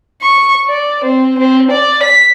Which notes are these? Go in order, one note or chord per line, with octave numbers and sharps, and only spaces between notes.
C#6
D5
C4
C4
D5
B6